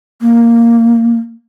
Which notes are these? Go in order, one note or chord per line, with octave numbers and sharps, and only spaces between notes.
A#3